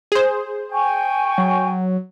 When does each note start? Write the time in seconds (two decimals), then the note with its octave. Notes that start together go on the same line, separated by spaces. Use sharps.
0.12 G#4 C5
0.72 G5 G#5 C#6
1.38 F#3